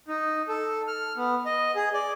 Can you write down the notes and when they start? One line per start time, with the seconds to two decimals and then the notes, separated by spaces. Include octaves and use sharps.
0.08 D#4
0.48 A4
0.87 F6
1.17 B3
1.46 D#5
1.75 G#4
1.94 D5